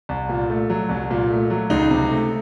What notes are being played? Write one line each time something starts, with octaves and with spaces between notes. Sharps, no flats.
C2
A#2
A3
F#3
C2
A#2
A3
F#3
C#2 D#4
C3
A3